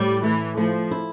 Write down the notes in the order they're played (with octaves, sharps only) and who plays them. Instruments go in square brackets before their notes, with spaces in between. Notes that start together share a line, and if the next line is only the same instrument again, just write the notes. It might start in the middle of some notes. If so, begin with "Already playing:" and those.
Already playing: [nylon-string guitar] A2 [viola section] G3
[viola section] E3 [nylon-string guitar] A3
[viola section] F3 [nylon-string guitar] A3
[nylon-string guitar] E4